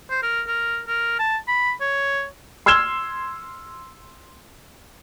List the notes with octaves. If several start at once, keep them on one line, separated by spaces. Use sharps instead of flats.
C5
A#4
A#4
A#4
A5
B5
C#5
C6 E6 F6 G#6 E7 G7